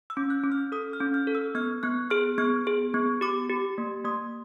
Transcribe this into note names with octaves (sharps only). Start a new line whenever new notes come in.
E6
C#4
F#6
C#4
F6
A4 D#6
F6
C#4
F6
A4
E6
B3 F6
B3 F#6
G#4 F6
B3 F6
G#4
B3
G4 D6
G4
A#3
A#3 D#6